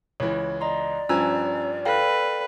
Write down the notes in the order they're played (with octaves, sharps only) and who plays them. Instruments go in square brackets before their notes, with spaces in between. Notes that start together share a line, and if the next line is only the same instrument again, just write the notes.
[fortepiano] C#2 E3 [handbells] C#5
[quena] D5 [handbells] D#5 A#5 C6
[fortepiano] G2 F3 G#5 [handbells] C#4 A#5 E6
[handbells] A4 F5 G5 [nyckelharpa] B4